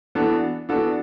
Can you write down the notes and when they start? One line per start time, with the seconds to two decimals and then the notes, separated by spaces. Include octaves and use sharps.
0.15 E3 B3 D4 F#4 A4
0.69 E3 B3 D4 F#4 A4